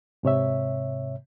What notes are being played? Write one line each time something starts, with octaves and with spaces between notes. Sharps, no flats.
G#2 C3 C#5 E5